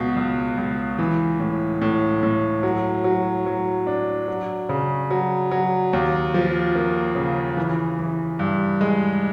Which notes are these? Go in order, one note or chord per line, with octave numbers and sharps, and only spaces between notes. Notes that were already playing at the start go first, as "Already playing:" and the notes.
Already playing: C#2 B2
C#2
C#2
E3
A2
A2
A2
F#3
F#3
F#3
D4
F#3
C#3
F#3
F#3
D#2
F3
A#3
C#3
E3
E3
G2
G#3